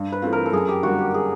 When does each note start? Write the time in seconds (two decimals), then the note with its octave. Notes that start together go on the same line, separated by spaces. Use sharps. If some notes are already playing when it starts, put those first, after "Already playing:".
Already playing: G2
0.12 B4
0.22 E3 A3 C4 F4
0.33 A#4
0.46 A4
0.52 F#2 G#4
0.69 G4
0.83 D3 G3 A#3 F#4
0.99 G4
1.14 G#4